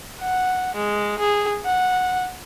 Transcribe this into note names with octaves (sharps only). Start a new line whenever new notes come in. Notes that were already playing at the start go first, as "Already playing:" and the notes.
F#5
G#3
G#4
F#5